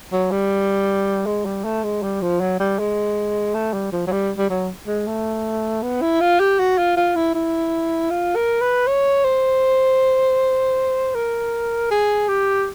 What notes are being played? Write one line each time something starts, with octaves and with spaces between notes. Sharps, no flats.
F#3
G3
G#3
G3
A3
G#3
G3
F3
F#3
G3
G#3
A3
G3
F3
F#3
G3
G3
F#3
G#3
A3
B3
E4
F4
G4
F#4
F4
F4
E4
E4
F4
A#4
B4
C#5
C5
A#4
G#4
G4